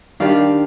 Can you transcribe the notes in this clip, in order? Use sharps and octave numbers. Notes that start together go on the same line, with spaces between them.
D#3 G3 D4 F5